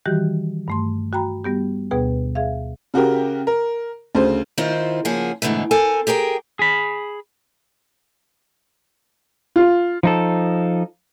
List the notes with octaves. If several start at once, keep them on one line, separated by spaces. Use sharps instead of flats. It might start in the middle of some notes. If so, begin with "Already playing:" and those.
D#3 E3 G3 F#4 G4 F#6
G2 A3 C6
F#4 G5 A#5 B5
G3 B3 G4
D2 B2 B3 G#4 B4 G5
G#4 E5 F5
C#3 F#4 G4 A#4
A#4
D2 C#3 C5
D#3 C4 E4 F4 C5
C#3 F3 A#3 G#4 F#5
G#2 B2 D3 E3 A3
C4 A4 A#4 G#5
G4 G#4 A#4 G5
G#4 B5
F4
F3 D#4 A4